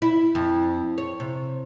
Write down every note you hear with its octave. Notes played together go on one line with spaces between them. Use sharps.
E4
F2
C#5
C3